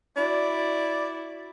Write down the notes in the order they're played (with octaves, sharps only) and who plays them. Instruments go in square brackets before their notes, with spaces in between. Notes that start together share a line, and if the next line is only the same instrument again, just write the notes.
[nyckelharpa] E4 F#4 [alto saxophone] D5